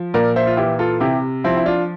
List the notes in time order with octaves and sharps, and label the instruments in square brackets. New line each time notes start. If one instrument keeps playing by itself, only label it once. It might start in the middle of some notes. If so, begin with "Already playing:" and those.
Already playing: [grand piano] F3
A#2 A#4 D5
C5 E5
F4
E3 E4 G4
F4 A4
C3 E4 G4
F3 C4 E4
E4
D4 F4